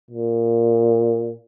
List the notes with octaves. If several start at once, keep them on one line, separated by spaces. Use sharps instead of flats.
A#2